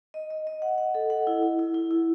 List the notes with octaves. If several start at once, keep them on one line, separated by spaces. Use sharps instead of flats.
D#5
D#5
D#5
F#5
F#5
A4
F#5
E4
E4
E4
E4
E4